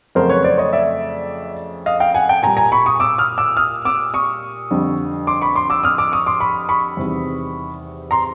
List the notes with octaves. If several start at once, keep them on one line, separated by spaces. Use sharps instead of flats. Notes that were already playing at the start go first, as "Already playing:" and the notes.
F2 C#3 F#3 A3 A#4 C5
B4 C#5
C5 D5
C#5 D#5
D5 E5
D#5 F5
F5 G5
F#5 G#5
G5 A5
A#2 G3 G#5 A#5
G#5 A#5
B5 C#6
C#6 D#6
D6 E6
D#6 F6
D6 E6
D#6 F6
D6 E6
C#6 D#6
F2 D3 G3
C6 D6
B5 C#6
C6 D6
D6 E6
D#6 F6
D6 E6
C#6 D#6
C6 D6
B5 C#6
B5 C#6
E2 C3 D#3 G3
A#5 C6